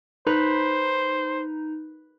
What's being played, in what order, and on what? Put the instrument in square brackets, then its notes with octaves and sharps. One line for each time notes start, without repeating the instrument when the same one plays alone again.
[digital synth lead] D#4 [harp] B4 [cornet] C5